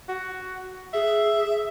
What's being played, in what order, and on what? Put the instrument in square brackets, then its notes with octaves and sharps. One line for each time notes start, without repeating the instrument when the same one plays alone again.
[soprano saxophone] F#4
[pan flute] G#4 [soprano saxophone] E5